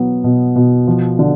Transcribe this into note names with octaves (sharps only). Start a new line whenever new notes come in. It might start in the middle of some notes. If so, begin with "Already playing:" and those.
Already playing: B2 F#3 B3
B2
B2
F3
D3